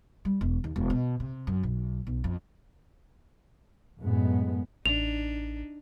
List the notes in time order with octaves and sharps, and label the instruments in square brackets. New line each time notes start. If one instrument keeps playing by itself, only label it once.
[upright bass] G3
E1
D#2
E1
B2
C3
F#2
B1
B1
F2
[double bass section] F#2 A2 G#3 B3
[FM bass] A1 [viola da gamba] D4 D#4 [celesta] F7